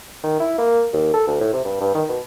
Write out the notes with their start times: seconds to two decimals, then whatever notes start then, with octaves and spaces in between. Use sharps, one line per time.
0.24 D#3
0.40 E4
0.58 A#3
0.93 D#2
1.14 A4
1.27 D2
1.40 A2
1.53 C3
1.65 G2
1.80 G2
1.94 D#3
2.09 B2